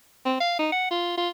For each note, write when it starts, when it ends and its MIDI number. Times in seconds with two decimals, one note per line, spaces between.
0.26 0.36 60
0.40 0.56 77
0.59 0.68 63
0.72 0.90 78
0.91 1.17 65
1.17 1.29 65